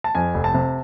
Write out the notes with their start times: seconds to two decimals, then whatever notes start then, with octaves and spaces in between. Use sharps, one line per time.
0.04 A5
0.15 F2 G#5
0.34 F1
0.44 A5
0.54 C3